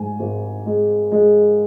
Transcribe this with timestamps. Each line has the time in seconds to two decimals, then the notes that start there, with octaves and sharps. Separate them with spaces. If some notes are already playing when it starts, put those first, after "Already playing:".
Already playing: G#2 G#5
0.19 G#1
0.66 G#3
1.12 G#3